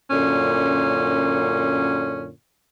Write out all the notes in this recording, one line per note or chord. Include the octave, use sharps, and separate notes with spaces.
F#2 A#2 D3 C#4